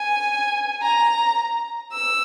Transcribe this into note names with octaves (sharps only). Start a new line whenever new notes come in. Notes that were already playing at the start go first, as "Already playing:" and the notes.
Already playing: G#5
A#5
E6